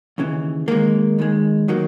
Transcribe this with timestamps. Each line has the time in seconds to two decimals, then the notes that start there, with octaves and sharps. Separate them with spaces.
0.18 D#2 C#3 E3
0.68 D#2 D#3 G#3 A#3
1.18 D#2 D#3 G#3
1.68 D#3 F#3 A#3